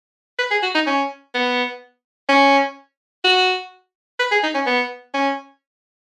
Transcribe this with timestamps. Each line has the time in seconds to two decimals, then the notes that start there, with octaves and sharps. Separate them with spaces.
0.39 B4
0.51 G#4
0.63 F#4
0.75 D#4
0.87 C#4
1.34 B3
2.29 C#4
3.24 F#4
4.19 B4
4.31 G#4
4.43 D#4
4.54 C#4
4.66 B3
5.14 C#4